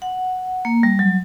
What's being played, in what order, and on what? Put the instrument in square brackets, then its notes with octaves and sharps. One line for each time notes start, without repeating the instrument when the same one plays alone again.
[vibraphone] F#5
A#3
G3
F#3